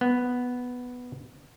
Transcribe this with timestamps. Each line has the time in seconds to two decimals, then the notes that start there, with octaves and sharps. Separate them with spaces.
0.01 B3